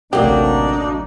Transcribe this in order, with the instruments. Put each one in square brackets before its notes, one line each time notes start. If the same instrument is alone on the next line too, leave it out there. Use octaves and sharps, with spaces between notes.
[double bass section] A1 D2 C3 [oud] F#3 A#3 [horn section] D4 D#4 [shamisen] G4